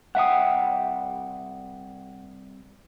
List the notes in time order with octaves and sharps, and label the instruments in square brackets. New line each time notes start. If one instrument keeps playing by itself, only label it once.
[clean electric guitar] C2 E5 G5 [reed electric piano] F#5 D#6